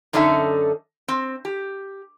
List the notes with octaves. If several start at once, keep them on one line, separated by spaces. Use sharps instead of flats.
F#2 D3 C#4 D#4 A4 E5
C4
G4